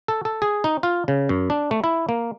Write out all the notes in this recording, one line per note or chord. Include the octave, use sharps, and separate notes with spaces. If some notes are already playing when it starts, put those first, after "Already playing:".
A4
A4
G#4
D#4
F4
C#3
F#2
D4
A3
E4
A#3